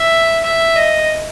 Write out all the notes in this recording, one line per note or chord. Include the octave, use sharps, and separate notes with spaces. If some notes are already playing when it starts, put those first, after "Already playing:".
Already playing: E5
E5
D#5